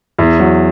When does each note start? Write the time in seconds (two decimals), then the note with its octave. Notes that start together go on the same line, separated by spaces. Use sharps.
0.19 E2
0.39 F#3